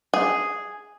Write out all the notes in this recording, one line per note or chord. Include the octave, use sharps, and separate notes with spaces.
G#4